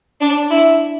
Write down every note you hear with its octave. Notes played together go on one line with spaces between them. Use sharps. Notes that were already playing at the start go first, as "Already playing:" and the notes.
D4
E4